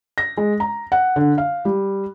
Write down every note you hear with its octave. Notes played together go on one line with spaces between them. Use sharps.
A#6
G#3
A#5
F#5
D3
F5
G3